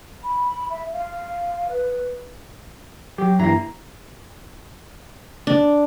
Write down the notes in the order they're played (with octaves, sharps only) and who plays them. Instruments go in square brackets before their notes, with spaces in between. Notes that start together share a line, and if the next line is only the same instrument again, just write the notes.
[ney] B5
E5
F5
B4
[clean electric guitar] F#3 [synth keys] G4
[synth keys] G2 E3 G3 [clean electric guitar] A#3 A#5
[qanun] D4